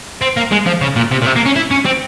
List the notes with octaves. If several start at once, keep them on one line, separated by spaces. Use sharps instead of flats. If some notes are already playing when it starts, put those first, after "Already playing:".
C4
A#3
G#3
F3
C#3
A#2
C3
A#2
C3
A#3
C#4
E4
C#4
C4